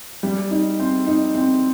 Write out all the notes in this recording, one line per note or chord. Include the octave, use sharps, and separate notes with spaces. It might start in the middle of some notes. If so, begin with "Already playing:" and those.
G3
D#4
C4
D#4
C4